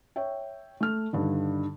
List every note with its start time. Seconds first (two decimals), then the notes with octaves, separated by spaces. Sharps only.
0.16 C#5 E5 G5
0.80 A3 F6
1.13 G2 D3 D#3